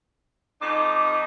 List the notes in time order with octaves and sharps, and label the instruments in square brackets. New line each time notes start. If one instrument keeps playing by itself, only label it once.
[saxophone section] F2 D#4 [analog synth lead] D6